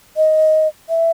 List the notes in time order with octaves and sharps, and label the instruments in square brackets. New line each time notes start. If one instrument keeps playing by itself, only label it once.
[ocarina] D#5
E5